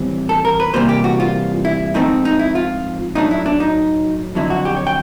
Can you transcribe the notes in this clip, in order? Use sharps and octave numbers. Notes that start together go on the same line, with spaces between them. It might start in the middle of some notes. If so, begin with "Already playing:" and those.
Already playing: A2 E3 G3 C4
A4
A#4
B4
C3 E3 G3 A#3 C5
G4
F#4
F4
E4
G#2 F3 A3 C4 D#4
D#4
E4
F4
A2 F#3 A3 D4 D#4
E4
D4
D#4
F2 D3 F#3 E4
F#4
G4
C#5
G5